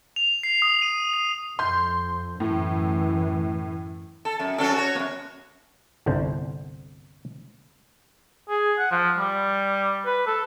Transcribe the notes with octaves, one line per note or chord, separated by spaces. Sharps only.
F7
C7
D#6
D#7
C7
F2 C6 G6
F#2 A2 E3
A4
F#2
F#3 C#4 A4
F#4 C#5
F#2 A#3
G1 C2 D3 D4 C5
G#4
F#5
F3
G3
B4
A4